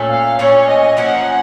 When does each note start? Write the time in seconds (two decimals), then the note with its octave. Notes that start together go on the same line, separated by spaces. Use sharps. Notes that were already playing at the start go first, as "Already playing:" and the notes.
Already playing: A#2 A3 C#4 A4
0.10 F5
0.39 A#2 A3 C#4 C#5
0.69 D#5
0.97 F3 A#3 C#4 F#5